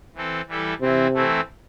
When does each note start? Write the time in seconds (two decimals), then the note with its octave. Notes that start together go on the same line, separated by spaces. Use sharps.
0.14 E3 C4 A4
0.47 E3 G3 E4 A4
0.81 C3 E3 C4 E4
1.14 E3 A3 C4 E4